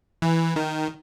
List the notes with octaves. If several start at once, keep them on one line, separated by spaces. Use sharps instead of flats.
E3
D#3